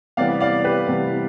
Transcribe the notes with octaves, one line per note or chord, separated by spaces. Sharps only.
C3 E3 G3 B3 D5 F5
D5 F5
G4 B4
C3 E3 G3 B3